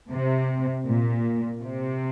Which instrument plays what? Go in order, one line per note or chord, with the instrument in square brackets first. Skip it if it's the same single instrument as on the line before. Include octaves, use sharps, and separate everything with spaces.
[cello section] C3
A#2
C3